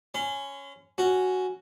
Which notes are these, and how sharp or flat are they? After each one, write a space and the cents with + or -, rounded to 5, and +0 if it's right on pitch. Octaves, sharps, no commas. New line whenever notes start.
C#4 +0 C6 -45
C#4 +0 F#4 +0